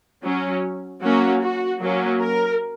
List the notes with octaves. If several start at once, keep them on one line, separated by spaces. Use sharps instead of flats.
F#3 C#4
F#3 A#3 C#4 F#4
F#4
F#3 A#3 C#4
A#4